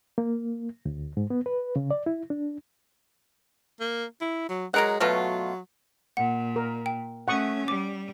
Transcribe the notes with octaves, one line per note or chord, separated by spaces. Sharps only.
A#3
D2
G#2
B3
B4
C#3
D5
E4
D4
A#3
E4
F#3
F#3 G#3 A#4 F#5
B2 F#3 A3 F4
A#2 F#5
A#4
G5
A3 C#4 F#5 C#6 D#6
G3 D6